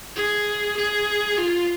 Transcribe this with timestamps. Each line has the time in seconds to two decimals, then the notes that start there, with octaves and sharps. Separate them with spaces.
0.16 G#4
0.77 G#4
1.38 F4